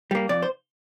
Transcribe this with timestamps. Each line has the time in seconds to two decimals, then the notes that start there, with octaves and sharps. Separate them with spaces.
0.11 G3 A#3
0.29 F2 D5
0.42 C5